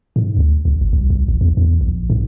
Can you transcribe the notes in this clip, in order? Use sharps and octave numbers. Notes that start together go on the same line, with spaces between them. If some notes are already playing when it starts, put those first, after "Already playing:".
G#2
D2
C#2
G#1
C2
C2
A1
E2
E2
A#1
G#2